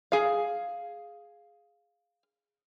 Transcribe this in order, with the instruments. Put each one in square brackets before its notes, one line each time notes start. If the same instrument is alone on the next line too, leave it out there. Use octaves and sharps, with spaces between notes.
[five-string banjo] G#4 F5